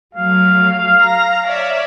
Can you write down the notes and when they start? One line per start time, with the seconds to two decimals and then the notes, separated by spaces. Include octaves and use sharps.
0.14 F#3 A3 F5
1.01 A#5
1.45 C#5 D5 E5